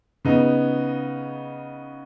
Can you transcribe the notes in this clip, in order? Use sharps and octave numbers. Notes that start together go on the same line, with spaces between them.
C#3 B3 D#4